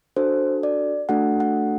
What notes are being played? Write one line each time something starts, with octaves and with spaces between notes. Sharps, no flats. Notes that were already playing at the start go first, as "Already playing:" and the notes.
D4 F#4 A4 C5
D5
A3 D4 F#4 A4 F#5
F#5